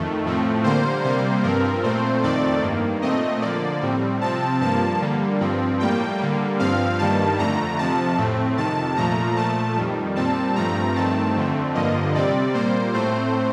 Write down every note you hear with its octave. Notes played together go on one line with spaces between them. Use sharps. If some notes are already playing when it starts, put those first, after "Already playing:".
Already playing: F2 D#3 A3
A2 F3 A3 C4
D3 G3 A#3 C5
C3 G3 A#3 C5
G2 F3 C4 A#4
A#2 A3 C4 C5
F2 D#3 A3 C4 D5
G2 D#3 A#3
A#2 A3 C4 D#5
D3 F3 A#3 D5
A2 G3 C4
C3 F3 C4 A5
G2 F3 A#3 A5
D3 G3 A#3
G2 F3 C4
A2 G3 A#3 G5
D3 G3 A#3
G2 F3 C4 F5
G2 D#3 G3 A#3 A5
F2 D3 A3 A#5
F2 C3 F3 A5
A2 A3 C4
F2 C3 D#3 A5
A#2 F3 A3 A#5
A#2 F3 A3 A5
F2 D#3 G3
A#2 G3 C4 A5
G2 F3 A3 C4 A#5
G2 D#3 A3 C4 A5
F2 D3 A3 C4
G2 D3 F3 A#3 D#5
C3 G3 C4 D5
A#2 G3 A#3 C5
A2 A3 C4 C5